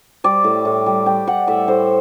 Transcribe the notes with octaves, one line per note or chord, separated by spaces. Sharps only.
G3 D5
A2
A2
G3
G3 G5
G3 F#5
A2 E5
A2 C5